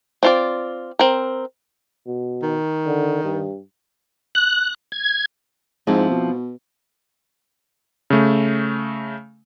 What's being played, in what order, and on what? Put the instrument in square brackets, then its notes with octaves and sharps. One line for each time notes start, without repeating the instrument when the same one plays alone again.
[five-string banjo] C4 F4 D5
C4 A#4
[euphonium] B2
[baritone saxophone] D#3
[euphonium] D3
G2
[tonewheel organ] F#6
G#6
[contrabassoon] G#2 [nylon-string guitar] F3 C4 E4
[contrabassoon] B2
[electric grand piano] C#3 A3